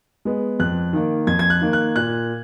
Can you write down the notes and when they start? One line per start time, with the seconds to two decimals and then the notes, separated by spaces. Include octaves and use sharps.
0.25 G#3 B3
0.60 F2 F#6
0.93 D#3 A#3
1.27 F2 G#6
1.39 G#6
1.50 F#6
1.61 D#3 A#3
1.73 F#6
1.96 A#2 F#6